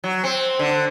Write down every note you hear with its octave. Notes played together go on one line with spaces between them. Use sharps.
F#3
C4
D3